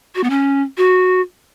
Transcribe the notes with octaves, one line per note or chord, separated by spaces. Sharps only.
F#4
B3
C#4
F#4